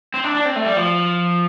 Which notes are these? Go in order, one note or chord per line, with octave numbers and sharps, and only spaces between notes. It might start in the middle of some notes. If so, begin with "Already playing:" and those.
C4
D4
D4
C4
A3
G3
F3